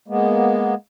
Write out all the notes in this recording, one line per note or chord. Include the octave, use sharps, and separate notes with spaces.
G#3 A#3 B3